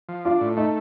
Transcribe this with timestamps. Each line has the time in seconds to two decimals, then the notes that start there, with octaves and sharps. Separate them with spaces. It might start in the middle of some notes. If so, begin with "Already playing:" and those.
0.09 F3
0.25 D4 F4
0.41 A2
0.57 A3 D#4